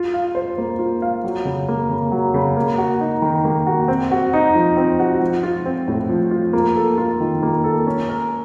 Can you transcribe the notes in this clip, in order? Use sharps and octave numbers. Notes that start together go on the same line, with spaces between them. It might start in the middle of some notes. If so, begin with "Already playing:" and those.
Already playing: F4
F5
C5
A#3
F4
F5
F#3
C#3
A#3
C#3
F#3
C#3
A#3
F#4
D#4
D#3
A#3
F#4
C4
F#4
D#4
F3
C4
F#4
F3
F4
C4
A2
F3
F4
A#3
A4
F4
D#3
A#3
A4
C#4
A#4